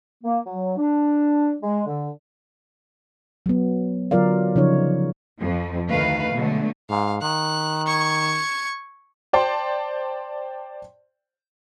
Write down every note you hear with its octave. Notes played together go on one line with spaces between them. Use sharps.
A#3
F#3
D4
G#3
D3
F#3 B3
D3 F#3 F4 A#4 D5 F5
C#3 F3 D#4 C#5
F2 F3
D2 D#3 A3 B4 F5
B2 D3 F#3 G#3 A3
G#2 F5
D#3 F#6
C#6 G#6
C5 D5 G5 A5 C6